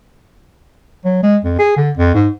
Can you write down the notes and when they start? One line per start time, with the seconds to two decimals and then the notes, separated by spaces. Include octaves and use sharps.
1.05 F#3
1.23 G#3
1.44 F2
1.59 G#4
1.76 D3
1.97 F2
2.14 G#2